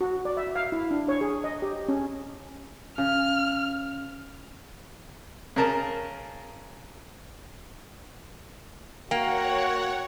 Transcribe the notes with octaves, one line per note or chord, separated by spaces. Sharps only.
F#4
D5
E5
F5
E4
D4
C#5
G#4
D#5
G4
C#4
C#3 F6
C#3 A#4 A5
A#3 F#4 C#5 F#5 G5